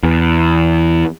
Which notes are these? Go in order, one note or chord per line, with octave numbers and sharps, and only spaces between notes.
E2